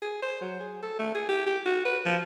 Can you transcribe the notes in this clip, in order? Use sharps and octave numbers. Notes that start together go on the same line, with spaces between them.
G#4
C5
F#3
G#4
A4
A3
G#4
G4
G4
F#4
B4
F3